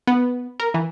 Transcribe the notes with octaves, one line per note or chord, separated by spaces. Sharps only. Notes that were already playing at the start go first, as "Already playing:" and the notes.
B3
A#4
E3